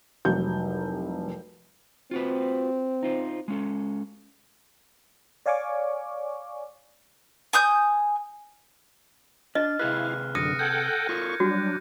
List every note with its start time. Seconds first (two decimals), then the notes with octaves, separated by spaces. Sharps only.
0.25 F1 C2 F#3 G6
2.11 C4 F4 F#4 B4
3.03 D#4 F4 C5
3.48 G#3 C#4 A4
5.46 C#5 D5 F5 G#5 C#6 D6
7.53 G#5 D#6 G6
9.55 D4 D#5 F6
9.79 C3 E4 G#4 B4 F5 F#6
10.35 F#2 D3 D#6 A#6 C#7 D#7
10.59 A4 F#5 G5 G6 G#6
11.09 F4 A4 A#4 C#6
11.40 F#3 G3 D4 F#4